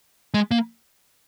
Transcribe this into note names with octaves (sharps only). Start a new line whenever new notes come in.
G#3
A#3